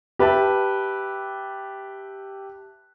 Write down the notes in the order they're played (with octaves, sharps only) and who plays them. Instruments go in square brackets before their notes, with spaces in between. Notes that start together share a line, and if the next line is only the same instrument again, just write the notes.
[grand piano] G4 B4 E5 A5